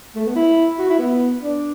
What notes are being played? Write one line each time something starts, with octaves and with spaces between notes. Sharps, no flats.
A3
B3
E4
F#4
E4
B3
D4